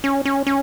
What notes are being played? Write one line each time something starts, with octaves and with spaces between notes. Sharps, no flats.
C#4
C#4
C#4